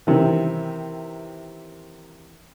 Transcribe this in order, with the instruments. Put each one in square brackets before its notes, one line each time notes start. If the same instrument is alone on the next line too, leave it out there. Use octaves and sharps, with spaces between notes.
[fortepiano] C3 D#3 E3